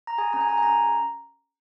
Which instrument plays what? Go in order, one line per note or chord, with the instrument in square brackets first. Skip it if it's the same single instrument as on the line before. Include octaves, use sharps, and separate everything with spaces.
[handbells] A#5
G#4 G#5
C#4 A#5
G#5
G#4 A#5
G#5
C#4 A#5